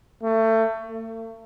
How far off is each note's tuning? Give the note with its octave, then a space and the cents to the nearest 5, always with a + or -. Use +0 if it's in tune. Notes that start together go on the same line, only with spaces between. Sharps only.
A3 +25
A3 +45